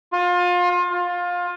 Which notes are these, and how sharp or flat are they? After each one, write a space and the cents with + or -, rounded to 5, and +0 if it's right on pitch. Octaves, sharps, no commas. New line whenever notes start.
F4 +30
F4 +20